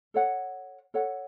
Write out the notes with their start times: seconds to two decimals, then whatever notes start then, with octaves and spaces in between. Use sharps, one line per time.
0.14 A4 C#5 F#5
0.94 A4 C#5 F#5